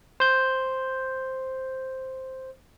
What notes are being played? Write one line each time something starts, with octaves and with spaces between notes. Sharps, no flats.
C5 G6